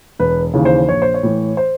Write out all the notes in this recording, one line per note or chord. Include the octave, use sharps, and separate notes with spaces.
E1 B4
D#2 C#3 E3
C5
A#1 C#5
C5
C#5
A2 E3
C5